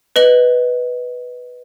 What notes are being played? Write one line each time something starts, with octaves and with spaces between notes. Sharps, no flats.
B4 D#5 F#7